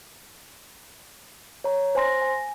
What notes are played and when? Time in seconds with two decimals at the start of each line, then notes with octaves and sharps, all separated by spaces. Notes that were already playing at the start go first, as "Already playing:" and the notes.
1.64 C#5 A#5
1.95 C5 G#5 C6 A#6
2.22 G#5